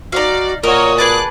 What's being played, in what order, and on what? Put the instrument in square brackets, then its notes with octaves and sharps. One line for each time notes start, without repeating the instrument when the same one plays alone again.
[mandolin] D#4 F5 [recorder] F#4 [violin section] D5
[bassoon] A#2 [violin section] F#4 C#5 D#5 [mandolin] A#4 [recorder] D#6
[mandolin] G#4 B4 A5 [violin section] D6 F#6